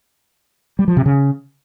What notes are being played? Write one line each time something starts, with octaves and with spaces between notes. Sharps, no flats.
G3
F3
C3
C#3